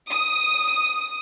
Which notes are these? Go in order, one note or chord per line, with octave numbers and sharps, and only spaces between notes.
D#6